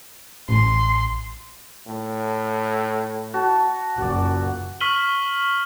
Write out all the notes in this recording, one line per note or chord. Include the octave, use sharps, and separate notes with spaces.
A1 C6
A2
F#4 A5
F#1 A#2 F#4 D5
C#6 F6 B6 D#7 F#7 G7